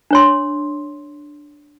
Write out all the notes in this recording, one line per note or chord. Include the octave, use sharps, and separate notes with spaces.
D4 C#5 C6